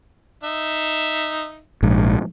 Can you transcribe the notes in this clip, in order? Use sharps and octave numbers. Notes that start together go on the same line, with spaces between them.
D#4 E5
A#1 G#2